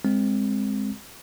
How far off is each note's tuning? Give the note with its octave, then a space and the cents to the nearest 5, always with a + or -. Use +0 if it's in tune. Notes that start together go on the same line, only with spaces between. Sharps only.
G#3 -15 C4 +0